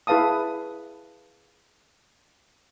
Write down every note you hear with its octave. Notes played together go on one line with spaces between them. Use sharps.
E4 G#4 B4 F5 A5 D#6